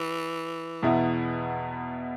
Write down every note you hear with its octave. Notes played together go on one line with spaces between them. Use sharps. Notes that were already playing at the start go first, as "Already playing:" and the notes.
Already playing: E3
E2 B2 B3 E4